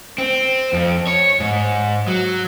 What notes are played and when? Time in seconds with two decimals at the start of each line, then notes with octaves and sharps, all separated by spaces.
0.18 C4
0.73 F2
1.07 C#5
1.40 G#2
2.08 F#3